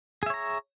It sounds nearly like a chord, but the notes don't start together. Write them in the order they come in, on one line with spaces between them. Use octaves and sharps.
G#4 E5 C#5 A#5